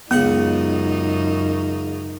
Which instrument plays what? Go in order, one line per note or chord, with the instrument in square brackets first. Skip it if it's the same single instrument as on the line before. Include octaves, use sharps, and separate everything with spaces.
[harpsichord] C#2 F#5 D#6 [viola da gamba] F#2 D#4 [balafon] B3